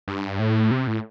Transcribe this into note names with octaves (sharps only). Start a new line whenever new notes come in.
G2
A2
C3
A2